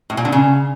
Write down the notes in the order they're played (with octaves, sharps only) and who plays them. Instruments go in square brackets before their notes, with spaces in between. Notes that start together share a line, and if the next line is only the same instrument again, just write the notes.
[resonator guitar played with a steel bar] A2
A#2
D3
C#3